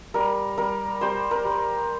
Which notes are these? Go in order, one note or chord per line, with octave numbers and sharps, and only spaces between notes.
G3 A#4
G3 A#4
G3 C5
A#4
G3